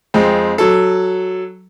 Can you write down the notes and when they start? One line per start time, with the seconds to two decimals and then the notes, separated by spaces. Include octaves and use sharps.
0.14 F2 G#3 C4
0.58 F#3 A4